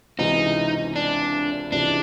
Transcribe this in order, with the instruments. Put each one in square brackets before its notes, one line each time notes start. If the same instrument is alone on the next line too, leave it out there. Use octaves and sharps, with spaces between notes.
[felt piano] C#2 C3 E3 [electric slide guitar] D#4
[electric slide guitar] D4
[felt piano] C#2 C3 E3 G#3 [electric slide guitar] D4